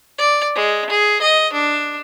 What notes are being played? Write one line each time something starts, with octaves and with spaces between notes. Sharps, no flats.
D5
G#3
G#4
D#5
D4